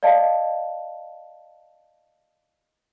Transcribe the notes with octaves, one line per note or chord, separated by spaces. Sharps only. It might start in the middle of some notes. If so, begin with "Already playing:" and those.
D5 D#5 F5 A5